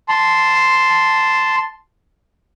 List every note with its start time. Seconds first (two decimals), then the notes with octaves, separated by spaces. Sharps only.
0.09 A5 C6